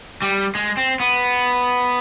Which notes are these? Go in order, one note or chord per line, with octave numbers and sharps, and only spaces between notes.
G3
G#3
C4
B3